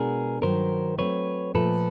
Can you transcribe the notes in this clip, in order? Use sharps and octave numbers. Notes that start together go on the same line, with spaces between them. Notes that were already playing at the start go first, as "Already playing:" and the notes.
Already playing: B2 G#3 B3 D4 G#4 A#4
G2 D#3 F#3 A#4 C5
F#3 A3 C4 B4 C#5
A#2 F3 A3 A4 B4